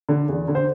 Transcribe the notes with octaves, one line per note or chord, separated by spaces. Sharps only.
D3
E2
D3
C5